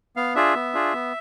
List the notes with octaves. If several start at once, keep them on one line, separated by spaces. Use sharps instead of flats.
B3 F5
D4 F4 G#4 E5
B3
D4 F4 G#4
B3